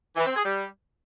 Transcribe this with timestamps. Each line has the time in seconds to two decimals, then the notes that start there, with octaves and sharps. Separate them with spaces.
0.16 E3
0.25 C4
0.35 G#4
0.44 G3